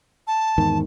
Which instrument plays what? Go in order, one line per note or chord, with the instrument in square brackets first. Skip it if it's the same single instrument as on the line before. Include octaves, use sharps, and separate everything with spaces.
[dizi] A5
[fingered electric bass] E2 G#2 D#3